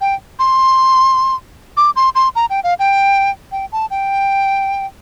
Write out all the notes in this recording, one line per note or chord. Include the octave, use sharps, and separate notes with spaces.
G5
C6
D6
C6
C6
A#5
G5
F5
G5
G5
A5
G5